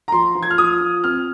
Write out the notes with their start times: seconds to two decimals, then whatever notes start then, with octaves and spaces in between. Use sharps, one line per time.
0.08 A#5
0.12 F3 C6
0.35 F3
0.43 G#6
0.50 F6
0.58 F3 D#6
0.81 F3
1.04 C4 F6